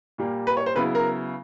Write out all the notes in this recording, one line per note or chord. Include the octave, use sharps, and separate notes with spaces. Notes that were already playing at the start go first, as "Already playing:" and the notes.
A#2 G3 A#3
B4
C#5
C5
C#3 F#3 B3 E4 B4
A#4